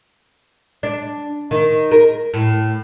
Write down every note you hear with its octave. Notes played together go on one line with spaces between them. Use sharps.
D4
D#3
A#4
A2